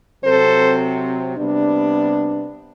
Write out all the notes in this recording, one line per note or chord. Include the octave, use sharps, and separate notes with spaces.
C3 F#3 C4 A4 C5
C3 G3 B3 D4